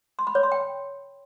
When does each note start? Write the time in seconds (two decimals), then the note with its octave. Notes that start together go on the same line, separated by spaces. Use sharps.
0.19 C6
0.27 B5
0.35 C#5
0.43 C6
0.52 G5